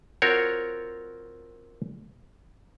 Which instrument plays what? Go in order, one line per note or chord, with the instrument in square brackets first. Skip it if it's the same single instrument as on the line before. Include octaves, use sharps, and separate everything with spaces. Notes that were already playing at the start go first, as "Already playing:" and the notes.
[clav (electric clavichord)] C4 F4 F#4 A#4 C#5